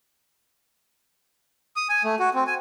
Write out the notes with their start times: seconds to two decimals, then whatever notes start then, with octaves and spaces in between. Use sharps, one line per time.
1.76 D#6
1.89 G#5
2.04 A3
2.19 F#4
2.34 C4
2.47 G#5